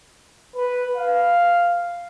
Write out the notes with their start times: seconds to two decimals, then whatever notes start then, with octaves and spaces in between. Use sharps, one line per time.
0.56 B4
0.97 F5